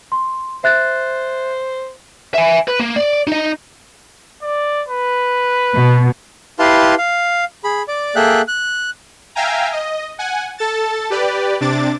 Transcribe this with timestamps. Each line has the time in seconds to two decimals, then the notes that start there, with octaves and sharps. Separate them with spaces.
0.12 C6
0.64 C5 E5 F#6 A6
2.34 E5 G#5
2.68 B4
2.80 A#3
2.96 D5
3.27 D#4 D#5
4.42 D5
4.88 B4
5.76 B2
6.59 E4 G4 B4 F5 A5 C6
6.98 F5
7.64 G#4 B5
7.88 D5 D6
8.16 A#3 G#4 A4 E5 G5 F#6
8.48 F#6
9.35 E5 F5 G5 G#5 A#5
9.72 D#5
10.19 F#5 G#5
10.58 A4 A5 A6
11.10 G4 B4 D5
11.61 C3 D4 D6 A6